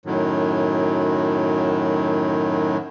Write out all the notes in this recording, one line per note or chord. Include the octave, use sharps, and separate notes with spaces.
F#2 A2 D#3 F#3